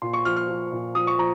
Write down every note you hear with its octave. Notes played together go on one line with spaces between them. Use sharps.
A#2 C6
C#6
F3 F6
F6
F3
A#2
F3 D#6
C#6
F3 A#5